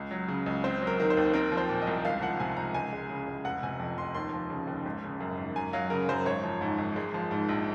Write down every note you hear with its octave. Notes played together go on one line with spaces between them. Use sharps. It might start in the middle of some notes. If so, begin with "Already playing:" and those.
Already playing: C#2
F#3
C#3
C#2
C4 C5
F#3
A#4
D#3
C5
D#2
C4 A#4
F3
C5
A#2
D#5
C2
C#2 F5
F3 F#5
C3 G#5
C#2 A#5
C#2 G#5
G#3
C#3
C#2
F1 F#5
C3 G#5
F2
F1 C6
D#2 C6
F3
C#3
D#2
G#1
C#3
F#2
G#1
F#2 G#5
F#3 F5
C#3 A#4
F#2 C5
G#1 C#5
F3
G#2
G#1
G#3
F3
G#2
A#1